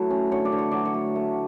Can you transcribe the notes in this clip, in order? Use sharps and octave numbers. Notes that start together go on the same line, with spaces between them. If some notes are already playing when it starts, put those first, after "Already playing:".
Already playing: F#3 A3 E4 B4
C#4
D3 C#5
D5
D3
C#5
F#3 D5
C#5
A3
A3